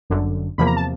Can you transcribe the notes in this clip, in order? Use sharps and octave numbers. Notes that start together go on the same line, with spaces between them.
G1 F#2 D3
E2 C3 F3 A#3 B5
A#5
A5